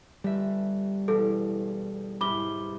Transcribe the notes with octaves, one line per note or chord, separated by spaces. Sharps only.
G1 G3 E5
E1 A4
C2 G#2 B5 D6 G7